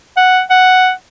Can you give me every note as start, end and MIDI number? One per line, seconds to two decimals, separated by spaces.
0.17 0.42 78
0.50 0.92 78